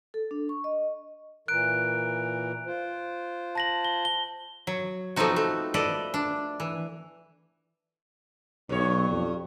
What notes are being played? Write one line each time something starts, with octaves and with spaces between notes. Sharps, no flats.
A4
D4
C#6
D#5
A#2 E3 A#4 F#6 D7
F4 C5
A5 A#6 F#7
G7
G7
F#3
F3 A3 B3 C4 D#4 F#4
A3
A4 B4 D5 D#5
D4
E3
B1 G2 C#5
F2